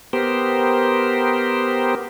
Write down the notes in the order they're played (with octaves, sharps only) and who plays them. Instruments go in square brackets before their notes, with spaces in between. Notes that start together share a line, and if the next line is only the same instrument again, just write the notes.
[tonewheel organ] B3 G4 A#4 C5